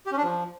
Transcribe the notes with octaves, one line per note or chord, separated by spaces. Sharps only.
G4
C#4
D4
F3